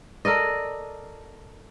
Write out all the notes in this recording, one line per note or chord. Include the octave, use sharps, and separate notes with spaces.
A4 A#4 D5 D#5